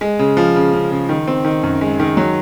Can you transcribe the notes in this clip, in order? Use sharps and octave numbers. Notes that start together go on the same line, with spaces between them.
G#3
C#3
F3
C#3
C#3
C#3
D#3
C4
D#3
F#2
G#3
D#3
F#3